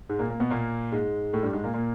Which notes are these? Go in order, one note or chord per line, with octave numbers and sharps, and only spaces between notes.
G#2 G#3
A#2 A#3
A#3
B2 B3
A#2 A#3
G#2 G#3
A2 A3
G2 G3
G#2 G#3
A#2 A#3
A#2 A#3